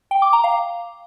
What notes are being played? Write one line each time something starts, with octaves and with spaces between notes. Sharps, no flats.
G5
D6
A#5
F5